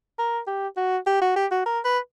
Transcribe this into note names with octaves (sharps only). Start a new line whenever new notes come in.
A#4
G4
F#4
G4
F#4
G4
F#4
A#4
B4